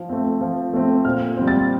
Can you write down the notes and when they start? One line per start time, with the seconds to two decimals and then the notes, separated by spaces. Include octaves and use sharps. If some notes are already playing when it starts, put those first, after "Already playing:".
Already playing: F3
0.09 A3 C4
0.41 F3
0.73 A3 C4
1.05 A#2 F6
1.37 G3 C4
1.48 A6